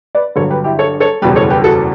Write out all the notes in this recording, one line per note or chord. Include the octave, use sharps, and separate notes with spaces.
B4 D5
G1 G2 F#3 A4 C#5
G4 B4
E4 G4
A4 C#5
A4 C#5
F#1 E2 B2 G3 G4 B4
A4 C#5
G4 B4
F#4 A4